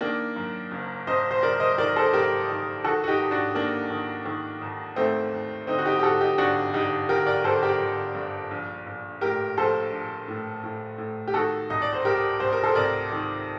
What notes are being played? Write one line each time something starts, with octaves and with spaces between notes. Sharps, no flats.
D#3 A#3 D4
F#2
F#1
F#1 C5 D#5
C5
F#1 A#4 D5
C5 D#5
D#3 A#4 D5
A4 C5
F#1 G4 A#4
D#3
D#3 F#4 A4
F#4
D#4 G4
D#2
D4 F#4
D#3 A#3 D4
D#3
D#3
D#2
D#2 A3 C4
D#2
D3 C4 D#4
F#4
D#4 G4
G4
D3 F#4 A4
D#4 G4
G1 D4 F#4
G1 D#4 G4
G1 G4 A#4
A#4 D5
G1 A4 C5
G4 A#4
G1
G2
A#1
A#1
A2 G4 A#4
A#1 A4 C5
A#1
A2
A2
A2
G4
D#3 F#4 A4
C2 D#5
D5
C5
C2 G4 A#4
C2 C5
A#4
A4 C5
C3 A#4 D5
D#3